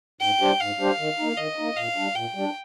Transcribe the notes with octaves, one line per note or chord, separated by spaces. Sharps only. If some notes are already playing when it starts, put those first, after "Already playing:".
G#2 G5
G3 D4 G4 C5
G#2 F5
G3 D4 G4 C5
D#3
A#3 D#4
D#3 D#5
A#3 D#4
A#2 F5
G3 D4
A#2 G5
G3 D4